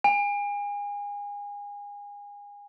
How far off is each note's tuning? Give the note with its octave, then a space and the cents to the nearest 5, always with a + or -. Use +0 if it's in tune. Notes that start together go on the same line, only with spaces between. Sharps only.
G#5 -30